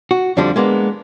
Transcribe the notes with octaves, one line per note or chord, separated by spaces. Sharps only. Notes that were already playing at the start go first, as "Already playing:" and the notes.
F#4
F2 D3 F3 G3 D4
G#3 A#3 B3 D4